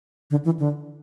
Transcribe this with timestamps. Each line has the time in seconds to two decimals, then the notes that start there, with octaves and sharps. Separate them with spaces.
0.31 D3
0.45 E3
0.59 D3